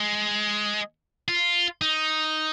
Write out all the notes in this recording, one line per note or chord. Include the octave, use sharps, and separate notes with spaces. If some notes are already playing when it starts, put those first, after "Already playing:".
Already playing: G#3
F4
D#4